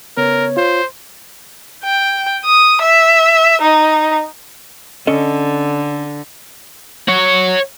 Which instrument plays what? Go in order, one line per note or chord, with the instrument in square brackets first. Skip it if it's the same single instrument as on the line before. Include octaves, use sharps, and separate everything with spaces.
[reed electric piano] C#3 B3 [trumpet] A#4 [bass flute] C#5
[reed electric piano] F4 [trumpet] C5
[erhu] G5
D#6
E5
D#4
[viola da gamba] D3 [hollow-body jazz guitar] C#4 A4 D#5
[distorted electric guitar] C#5 F#5